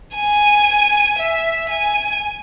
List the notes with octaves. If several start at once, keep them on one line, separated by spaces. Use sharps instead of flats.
G#5
E5
G#5